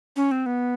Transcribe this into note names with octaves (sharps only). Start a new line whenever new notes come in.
C#4
C4
B3